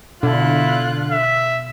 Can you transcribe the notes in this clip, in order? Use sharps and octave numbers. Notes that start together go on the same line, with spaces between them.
B2 D3 E4 F4 F#6
E5